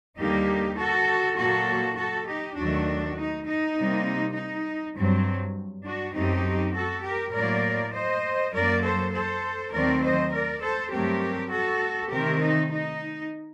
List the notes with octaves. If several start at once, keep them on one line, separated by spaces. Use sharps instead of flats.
D#2 D3 G3 A#3 D#4 G4
F#4 A4
A#2 F#3 A#3 F#4 A4
F#4 A4
D#4 G4
D#2 D#3 F#3 A3 D4 F#4
D#4
D#4
C3 G3 A#3
D#4
G2 F#3 C4
D4 F#4
F#2 F#3 A3 C4 D#4 G4
F#4 A4
G4 A#4
A2 F#3 A#3 A#4 D5
C5 D#5
F#2 F#3 A#3 A#4 D5
A4 C5
A4 C5
D#2 D#3 F#3 A3 C4 A#4 D5
C5 D#5
A#4 D5
A4 C5
G2 F#3 A3 C4 G4 A#4
F#4 A4
C3 D#3 A3 C4 G4 A#4
D#4
D#4